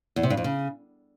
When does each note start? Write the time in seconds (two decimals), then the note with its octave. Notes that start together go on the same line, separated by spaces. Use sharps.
0.16 E2
0.23 C3
0.30 G2
0.37 F2
0.44 C#3